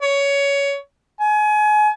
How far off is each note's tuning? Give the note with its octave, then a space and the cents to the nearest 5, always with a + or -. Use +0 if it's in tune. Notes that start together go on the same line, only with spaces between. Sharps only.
C#5 +15
G#5 +30